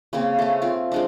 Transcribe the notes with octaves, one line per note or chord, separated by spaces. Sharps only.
C#3 A#3 C4 C#4
A3 C#4
C4 F4
F3 G#3 D4